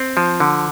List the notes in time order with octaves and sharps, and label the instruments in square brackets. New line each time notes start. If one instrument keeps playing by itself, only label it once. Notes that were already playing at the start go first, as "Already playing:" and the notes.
Already playing: [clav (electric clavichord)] C4
F3
D3